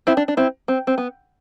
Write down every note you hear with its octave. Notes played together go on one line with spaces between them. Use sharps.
C4 E4
D4
D4
C4 E4
C4
C4
B3